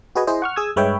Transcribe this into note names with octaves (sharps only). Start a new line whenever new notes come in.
F#4 G#4 B4 D#5 G#5
E4 G#4 C5 D#5
F#5 C#6 F6
G#4 D#6 E6 G#6
G2 G#3 B4 C#5 E5 G5